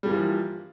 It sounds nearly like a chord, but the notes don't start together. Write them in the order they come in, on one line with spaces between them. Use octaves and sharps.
G3 G2 A#3 E3 F3